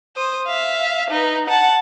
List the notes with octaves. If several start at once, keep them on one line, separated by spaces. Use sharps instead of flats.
C5 D#6
E5 F5
D#4 B4
F#5 A5